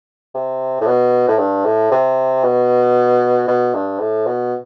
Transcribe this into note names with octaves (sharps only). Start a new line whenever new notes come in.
C3
A2
B2
A2
G2
A2
C3
B2
B2
G2
A2
B2